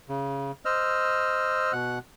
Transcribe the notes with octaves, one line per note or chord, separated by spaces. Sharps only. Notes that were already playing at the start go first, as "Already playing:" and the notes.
C#3
C5 D#5 E6 F6
B2 F#5 F#6